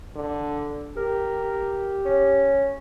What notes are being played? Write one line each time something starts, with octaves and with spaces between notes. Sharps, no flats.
D3
G4 A#4
C#4